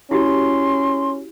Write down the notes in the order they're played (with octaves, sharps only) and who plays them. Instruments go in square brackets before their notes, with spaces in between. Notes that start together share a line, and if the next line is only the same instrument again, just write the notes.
[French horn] C#4 [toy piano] E4 F#4 G4 [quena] C6